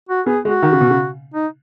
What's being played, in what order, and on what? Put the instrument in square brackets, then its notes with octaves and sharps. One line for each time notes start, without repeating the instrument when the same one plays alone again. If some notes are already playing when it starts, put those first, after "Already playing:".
[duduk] F#4
[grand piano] B3 [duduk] G#4
[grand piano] G#3 [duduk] F#4
[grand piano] D#3
C#3
B2
C#3
[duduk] D#4